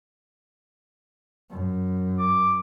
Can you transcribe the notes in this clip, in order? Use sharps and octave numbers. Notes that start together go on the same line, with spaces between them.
F#2
D6